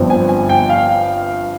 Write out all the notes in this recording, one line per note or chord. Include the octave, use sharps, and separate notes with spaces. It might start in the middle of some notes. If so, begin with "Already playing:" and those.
Already playing: G1 G2 F3 C4
G#5
G#5
G5
F5